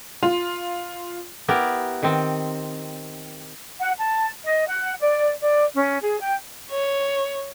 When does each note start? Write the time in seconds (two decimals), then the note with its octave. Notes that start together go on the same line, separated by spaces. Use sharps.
0.23 F4
1.48 B3 E4 G4 A#4
2.03 D#3 C4
3.80 F#5
3.98 A5
4.43 D#5
4.68 F#5
5.00 D5
5.41 D5
5.75 C#4
6.02 G#4
6.20 G5
6.71 C#5